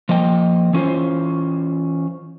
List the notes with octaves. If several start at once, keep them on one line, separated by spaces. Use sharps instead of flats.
F3 A#3 D#5 G5
E3 C#4 F4 C5